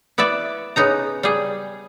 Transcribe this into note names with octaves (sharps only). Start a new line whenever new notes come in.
B3 E4 B4 D5 E5
C#3 B3 D#4 A#5
G3 G#4